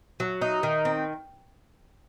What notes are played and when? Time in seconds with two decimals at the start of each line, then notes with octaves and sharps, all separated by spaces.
0.20 F#3
0.41 D#4
0.63 D#3
0.85 C4